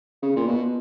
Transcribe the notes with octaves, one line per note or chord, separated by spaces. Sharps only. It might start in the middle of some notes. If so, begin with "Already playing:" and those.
C#3
A#2
B2